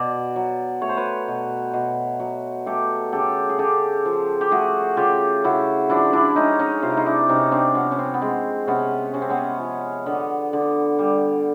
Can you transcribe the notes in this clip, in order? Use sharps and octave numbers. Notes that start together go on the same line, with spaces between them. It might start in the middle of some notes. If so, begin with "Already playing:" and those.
Already playing: B2 D5
F#3
A3 C#5
C5
B4 C#5
B2
B2
F#3
A3 G4 A4
C#3 G4 A4
G#4
C#3 G4 A4
F3
G4
A3 F#4 G#4
C#3 F4 G4
C#3 E4 F#4
F3 D4 E4
D4 E4
G#3 C#4 D#4
C#4 D#4
C3 F4
E4
D#4 F4
D4 E4
C3 C#4 D#4
C4 D4
F3 B3 C#4
C#4
C4
B3
G#3 C4
C3 B3 C#4
C3 C#4
C4
B3 C#4
F3
D3 B3
D3
G3